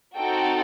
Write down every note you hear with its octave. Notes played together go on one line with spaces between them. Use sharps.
C4 D#4 F#4 A4 G5